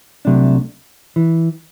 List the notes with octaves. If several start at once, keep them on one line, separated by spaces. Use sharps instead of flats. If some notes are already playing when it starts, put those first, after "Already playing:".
C2 C3 F#3 A3 D4
E3